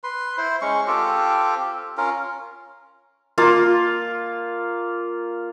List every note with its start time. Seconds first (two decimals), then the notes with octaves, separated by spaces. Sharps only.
0.04 B4 C6
0.38 E4 C5
0.62 G#3 C#4 C#6
0.87 C4 F4 G4 A4
1.97 C#4 F4 A#4
3.38 A#3 F4